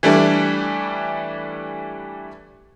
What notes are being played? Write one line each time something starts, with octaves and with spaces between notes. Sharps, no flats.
E3 G3 A3 D4